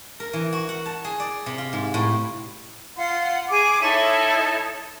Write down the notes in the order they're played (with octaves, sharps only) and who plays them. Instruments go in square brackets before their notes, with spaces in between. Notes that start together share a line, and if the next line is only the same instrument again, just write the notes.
[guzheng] A#4
E3
F#4
F#5
A5
G#4
D5
C3
F4
G#2
A2
[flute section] F4 F#5 C6
G#4 D6
D#4 E4 A4 C#5